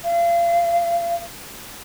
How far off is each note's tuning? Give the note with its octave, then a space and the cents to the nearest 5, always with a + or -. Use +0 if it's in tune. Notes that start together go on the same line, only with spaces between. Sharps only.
F5 -35